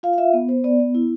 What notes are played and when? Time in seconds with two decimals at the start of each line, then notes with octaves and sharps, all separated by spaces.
0.03 F4 F5
0.13 F5
0.18 F4 E5
0.33 B3
0.49 B3 C5
0.64 B3 D5
0.80 B3
0.95 E4